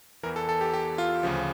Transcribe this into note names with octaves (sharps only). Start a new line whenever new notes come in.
E2 E3 A#4
A4
A4
G4
G4
F4
D2 C#3 F3